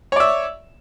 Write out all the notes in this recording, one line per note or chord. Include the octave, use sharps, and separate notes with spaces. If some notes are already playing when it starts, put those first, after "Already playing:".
C#5 D5 E5